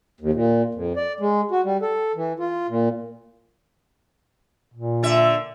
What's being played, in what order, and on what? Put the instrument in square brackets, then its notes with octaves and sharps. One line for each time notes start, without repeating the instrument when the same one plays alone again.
[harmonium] D#2
A#2
F2
D5
G#3
F#4
G3
A4
E3
F4
A#2
[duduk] A#2
[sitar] D3 E5